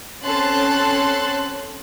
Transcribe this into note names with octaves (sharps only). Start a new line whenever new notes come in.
C4 C#4 A4 C6 F#6 A6